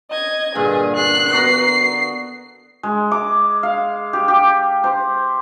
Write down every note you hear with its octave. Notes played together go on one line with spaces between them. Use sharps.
D#5 G#6
G2 A#2 D3 G#4
F#6 C7
B3 F#4 A#5 C7
G#3
D6
F5
G4
G4
C5